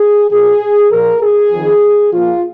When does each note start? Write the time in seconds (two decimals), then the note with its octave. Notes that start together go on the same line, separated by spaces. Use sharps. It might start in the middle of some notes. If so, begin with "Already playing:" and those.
Already playing: G#4
0.31 A#2 F3 G#4
0.92 A#2 F3 A#4
1.21 G#4
1.51 F2 D#3
2.12 A#2 F3 F4